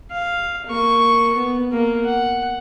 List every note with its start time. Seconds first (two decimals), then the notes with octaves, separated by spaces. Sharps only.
0.11 F5
0.67 A#3 C#6
1.36 B3
1.72 A#3
2.05 F#5